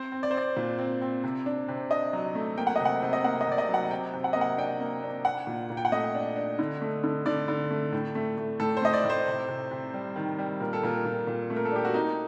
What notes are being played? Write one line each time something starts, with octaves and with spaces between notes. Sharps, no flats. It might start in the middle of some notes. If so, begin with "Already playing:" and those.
Already playing: C4 C5
C4
D5
C5
C4 D5
A#2
C4
C4
C3
D4
C3
D4 D#5
F#3
A3
A#3 G5
F#5
D#5
C3
F#5
C3
D#5
A#3 F#5
D#5
C3 D5
D#5
F#3
F#5
C3 G5
C3
F#5
A#3 D#5
F#5
D4 G5
A#3
D4
D4 F#5
A#2
A#2
G5
F#5
A3 D#5
D4
D4
D3
A3
D3
D3 D5
D3
A3
A2
A3
A3
A2 A4
C5
A3 D#5
D5
A2
C5
C3
C3
C3
G3
D#3
G3
A#2 A#4
A4
A#2 A#4
A#2
A#2
A3
A#4
A4
D4 G4
F#4
A#3 D#4